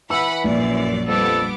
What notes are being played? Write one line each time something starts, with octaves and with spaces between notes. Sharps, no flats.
E3 B4 F#5 B5 E6
A#1 F#2 D5
F2 G3 B3 A4 D6